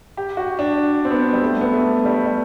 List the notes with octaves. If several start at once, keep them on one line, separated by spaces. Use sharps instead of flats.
G4
F#4
D4
C4
B3
G3
A3
B3
A3
G3
G3